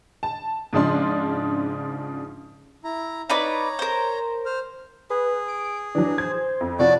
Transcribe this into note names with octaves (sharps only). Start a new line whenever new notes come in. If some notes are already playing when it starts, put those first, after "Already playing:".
A5
G#2 C#3 F3 D4 C6
E4 A#5
D#4 B4 C#5 D5 A#5
A#4 C5
C5 F6
G#4 B4
D7
E3 F#3 D4
C5 G#6
F2
C3 F3 F#4 C#5 D5